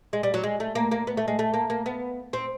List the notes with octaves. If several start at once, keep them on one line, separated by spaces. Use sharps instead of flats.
G#3
G3
F#3
G#3
A3
A#3
A#3
B3
A3
G#3
A3
A#3
A#3
B3
C4